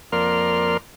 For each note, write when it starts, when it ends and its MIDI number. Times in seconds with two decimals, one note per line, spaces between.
0.12 0.77 41
0.12 0.77 58
0.12 0.77 70
0.12 0.77 74
0.12 0.77 84
0.12 0.77 89